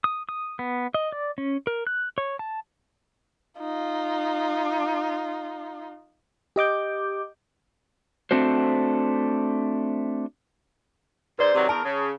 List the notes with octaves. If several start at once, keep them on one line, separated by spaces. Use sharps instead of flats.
D#6
D#6
B3
D#5
D5
C#4
A#4
F#6
C#5
A5
D#4 F4
G4 D#5 D6 G6
A3 C4 D4 F#4 C5
G#2 B4 C5 D5
C3 D#3 F#3
E2 A#4 A5
C#3